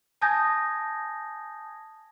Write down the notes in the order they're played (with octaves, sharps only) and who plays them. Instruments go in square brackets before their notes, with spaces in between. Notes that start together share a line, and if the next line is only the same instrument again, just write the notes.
[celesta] G#5 A5 D#6 G6 G#6 A#6